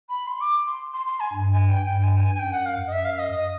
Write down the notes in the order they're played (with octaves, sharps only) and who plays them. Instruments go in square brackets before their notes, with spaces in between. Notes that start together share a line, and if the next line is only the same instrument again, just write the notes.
[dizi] B5
C6
D6
C6
C6
C6
G#5
[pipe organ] G2
[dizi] G#5
G5
[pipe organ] G2 [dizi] G5
[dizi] G#5
G5
G#5
G#5
[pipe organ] F#2 [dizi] G5
[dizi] F#5
F5
D#5
[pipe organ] F#2 [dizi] E5
[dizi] F5
D#5
D#5